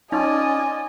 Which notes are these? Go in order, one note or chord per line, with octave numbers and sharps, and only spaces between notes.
C#4 D#4 F4 D5 D#5 G#5